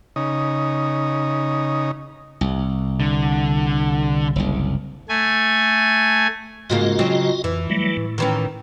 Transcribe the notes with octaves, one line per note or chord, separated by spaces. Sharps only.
C#3 D#4
C2
D3
F#1 C2
A3 G#5
G#2 C#3 A#3 F4 F#4 D#5
C#3 F#3 C4
F2 E3
F#3 G3 A3
A2
D#3 E3 C#4